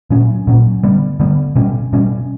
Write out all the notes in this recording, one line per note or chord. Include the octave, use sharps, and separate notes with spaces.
A#2 F#3 C#4
A#2 F#3 C#4
D3 G3 B3
D3 G3 B3
B2 G3 C#4
B2 G3 C#4